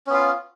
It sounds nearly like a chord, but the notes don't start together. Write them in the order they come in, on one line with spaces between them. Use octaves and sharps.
C#4 B3 F4